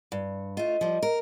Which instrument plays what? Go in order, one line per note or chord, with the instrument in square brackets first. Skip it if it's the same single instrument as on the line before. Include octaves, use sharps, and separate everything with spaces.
[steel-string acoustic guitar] G2
[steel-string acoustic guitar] A3 F4 [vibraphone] D#5
[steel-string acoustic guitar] F3 G3
A#4